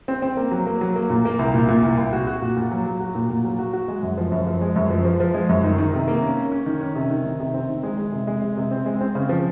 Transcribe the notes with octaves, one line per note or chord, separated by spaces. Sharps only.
C4
C4
A#3
F#3
A#3
F#3
A#3
A#2
A#3
C2
A#2
A#2
C2
C2
F#4
F#4
A#2
A#2
F#3
F#3
F#4
A#2
A#2
F#3
F#4
F#4
G#3
F#2
F3
F#2
F3
G#3
F#2
F3
F3
F3
G#3
F#2
D#3
D#3
C3
A#3
C#4
C#4
C#4
D#3
C#4
C3
D#3
D#3
C3
C4
D#3
G#3
G#3
C3
G#3
G#3
C3
C4
G#3
C4
C#3
F3